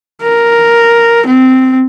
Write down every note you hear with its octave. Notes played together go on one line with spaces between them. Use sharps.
A#4
C4